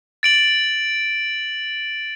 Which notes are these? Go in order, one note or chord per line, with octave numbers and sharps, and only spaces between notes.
A6 D7 F#7